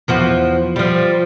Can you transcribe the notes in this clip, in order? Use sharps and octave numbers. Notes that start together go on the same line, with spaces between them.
E2 F3 F#4
F3 G3